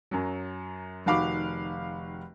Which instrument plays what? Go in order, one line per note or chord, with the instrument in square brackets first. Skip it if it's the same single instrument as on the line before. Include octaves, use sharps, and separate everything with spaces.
[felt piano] F#2 F#3
F1 D#3 F#4 F5 B5 D6